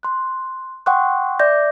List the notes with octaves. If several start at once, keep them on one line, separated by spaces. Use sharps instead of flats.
C6 F#6
F#5 G5 C6 C#6 D#6 F#6
D5 E5 D6 G6 A#6